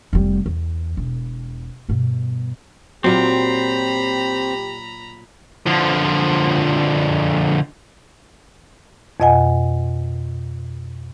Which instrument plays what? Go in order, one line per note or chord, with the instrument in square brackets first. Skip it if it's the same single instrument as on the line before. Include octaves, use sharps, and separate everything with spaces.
[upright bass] F1 G3
E2
E1
G2 B2
[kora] A#2 F#3 [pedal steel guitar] C4 [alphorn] G4 [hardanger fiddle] A#5 B5
[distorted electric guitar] D3 F3
[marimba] F2 B2 D#5 F#5 G#5